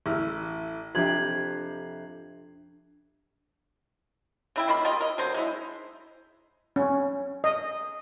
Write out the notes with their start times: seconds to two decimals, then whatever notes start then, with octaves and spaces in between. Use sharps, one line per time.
0.06 A1 E4 F6
0.95 F2 C3 D4 G#6 F#7
4.56 C#3 E4 G5
4.68 D#3 A#3 F4 B5
4.85 F4 G4 A#4 D#5
5.00 A#4 D#5
5.18 D3 F#3 C5
5.34 G#3 D#4 E4
6.76 C#4
7.44 D#5